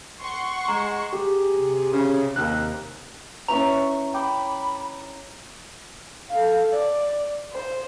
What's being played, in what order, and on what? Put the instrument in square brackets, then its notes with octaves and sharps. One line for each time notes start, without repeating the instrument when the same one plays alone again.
[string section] F#5 C6 C#6
[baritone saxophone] G#3 [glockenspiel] A#5
[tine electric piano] G4 [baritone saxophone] G#4
[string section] C3
[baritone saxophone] C#3
[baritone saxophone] D#2 [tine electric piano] F#6
[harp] C#4 E4 B4 [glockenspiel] A#5 [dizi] C#6
[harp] G5 D6 [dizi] B5
[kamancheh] A4 F5
D5
C5